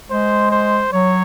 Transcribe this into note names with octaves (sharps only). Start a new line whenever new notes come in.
G#3 C5
C5
F#3 C#5